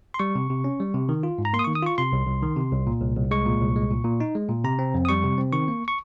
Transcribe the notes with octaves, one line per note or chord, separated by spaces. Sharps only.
C6
G3 C#6
C3
C3
C#4
G3
C3
D#3
F4
G#2
A#5
A#3 C6
D#6
C#6
D#3
D#6
F4 C#6
C3 C6
C2
C2
D#3
C3
C2
A#2
C2
C2
G#3 C#6
A#2
C2
G#3
A#2
A#2
D#4
G#3
A#2
C3 A#5
C4
F2
D#6
G3 C#6
C3
C4
D#3 C#6
A#3
C#6